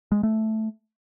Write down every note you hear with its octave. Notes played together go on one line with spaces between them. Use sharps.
G#3
A3